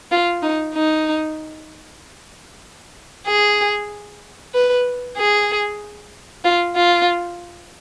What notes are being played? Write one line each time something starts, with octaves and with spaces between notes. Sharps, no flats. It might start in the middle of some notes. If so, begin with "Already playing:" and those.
F4
D#4
D#4
G#4
B4
G#4
F4
F4